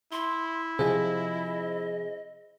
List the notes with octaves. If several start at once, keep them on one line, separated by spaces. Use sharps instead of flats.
E4 C6
C3 F3 G#4 C5 D#5